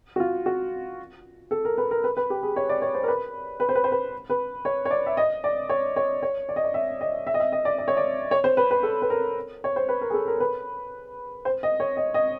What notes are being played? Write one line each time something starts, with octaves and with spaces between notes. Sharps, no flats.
F#4
F4
F#4
A4
A#4
B4
A#4
B4
B4
G4
G#4
C#5
D5
C#5
C5
A#4
B4
B4
C5
B4
C5
B4
B4
C#5
C#5
D5
E5
D#5
D5
C#5
C#5
C#5
D5
D#5
D5
E5
D#5
E5
D#5
E5
D#5
D5
D5
C#5
D5
C#5
C5
B4
B4
A4
B4
A#4
C#5
C5
B4
A#4
G#4
A4
A#4
B4
C5
D#5
C#5
D#5
D#5